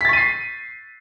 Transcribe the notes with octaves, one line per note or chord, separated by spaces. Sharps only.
C#6 A6 B6 C7 D#7